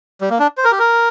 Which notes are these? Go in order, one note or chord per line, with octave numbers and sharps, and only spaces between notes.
G3
A#3
D4
C5
A#4
G4
A#4